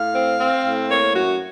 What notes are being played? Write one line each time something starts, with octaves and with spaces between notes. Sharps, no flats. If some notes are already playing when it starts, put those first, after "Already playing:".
Already playing: A2 F5
C4
C4
A2
A#3 C#5
F#2 F#4